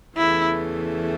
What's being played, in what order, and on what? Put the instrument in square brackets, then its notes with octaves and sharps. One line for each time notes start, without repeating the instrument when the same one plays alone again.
[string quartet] E2 C#3 E3 A3 [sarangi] E4